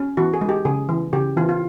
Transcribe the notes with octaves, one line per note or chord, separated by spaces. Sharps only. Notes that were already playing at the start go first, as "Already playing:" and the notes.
Already playing: C#4
E3 F#4
G#4
G#3
G4
C#3 G#4
E3
C#3 G4
E3 F4
F4